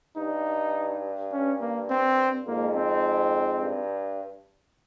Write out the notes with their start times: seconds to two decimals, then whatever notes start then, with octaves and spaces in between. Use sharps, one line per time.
0.16 G2 D#4
1.32 C#4
1.61 A#3
1.89 C4
2.47 F2 G#2 A#3
2.76 C4
3.61 G2